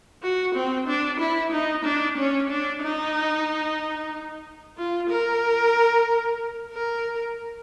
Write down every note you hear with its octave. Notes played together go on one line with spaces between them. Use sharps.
F#4
C4
D4
E4
D#4
D4
C#4
D4
D#4
F4
A#4
A#4